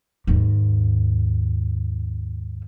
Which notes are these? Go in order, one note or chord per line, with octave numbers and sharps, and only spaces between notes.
D#2 G#2